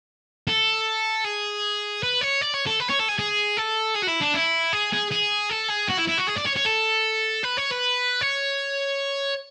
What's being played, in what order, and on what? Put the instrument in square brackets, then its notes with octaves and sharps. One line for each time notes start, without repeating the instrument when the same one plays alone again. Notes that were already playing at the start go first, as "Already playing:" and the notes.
[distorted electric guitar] A4
G#4
B4
C#5
D5
C#5
A4
B4
C#5
A4
G#4
G#4
A4
G#4
F#4
E4
D4
E4
G#4
G#4
G#4
A4
G#4
F#4
E4
E4
F#4
G#4
D5
C#5
C#5
A4
B4
C#5
B4
C#5